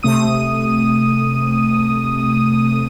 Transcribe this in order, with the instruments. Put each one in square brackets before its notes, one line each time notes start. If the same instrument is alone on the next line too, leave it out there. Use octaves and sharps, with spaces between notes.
[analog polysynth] C3 A3 D#6 D#7